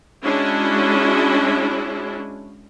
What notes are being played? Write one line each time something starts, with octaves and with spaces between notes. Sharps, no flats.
G#3 C#4 D4 E4 F#4